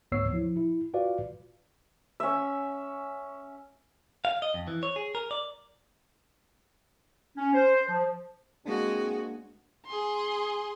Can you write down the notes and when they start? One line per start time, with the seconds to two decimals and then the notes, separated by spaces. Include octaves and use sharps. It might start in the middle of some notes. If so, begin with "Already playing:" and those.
0.12 D2 G#2 B3 C#5 E6 C7
0.33 F3 E4
0.57 E4
0.94 F4 F#4 B4 D5 F5
2.20 C#4 E5
4.25 F5
4.42 D#5
4.54 F2
4.68 E3
4.83 C#5
4.96 G#4
5.15 A#4
5.31 D5
7.37 C#4
7.54 C5
7.89 F3
8.65 G#3 A#3 C4 D4 F#4 G#4
9.86 G#4 C6